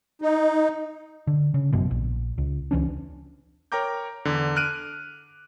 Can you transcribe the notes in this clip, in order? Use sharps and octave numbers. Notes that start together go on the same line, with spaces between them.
D#4
D3
C#3
G#1 F#2 B2
A#1
C#2
C#2 E3 C#4 D4
A#4 C#5 G5 A#5 D6 G6
E2 D3
F6 F#6 D7 D#7